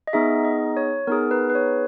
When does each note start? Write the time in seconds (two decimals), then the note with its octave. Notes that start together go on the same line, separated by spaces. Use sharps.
0.07 D#5
0.13 B3 D#4 G#4 E5
0.44 D#5
0.77 C#5
1.07 B3 D#4 G#4 A#4
1.31 B4
1.50 B4
1.55 C#5